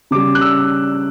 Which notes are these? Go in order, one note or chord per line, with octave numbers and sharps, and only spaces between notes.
C#3 G3 D6
F#6
E6